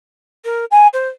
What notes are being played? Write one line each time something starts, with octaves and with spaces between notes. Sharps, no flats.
A#4
G#5
C5